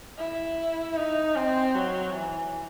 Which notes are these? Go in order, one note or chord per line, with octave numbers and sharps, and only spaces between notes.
E4
D#4
C4
F#3
E3